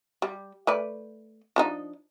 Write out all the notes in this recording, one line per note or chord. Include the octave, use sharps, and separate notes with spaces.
G3
A3 B4 D5
F3 D4 D#4